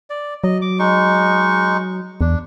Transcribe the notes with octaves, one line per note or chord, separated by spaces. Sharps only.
D5
F#3 D#5
D6
G#3 D#4 C#6
E2 D4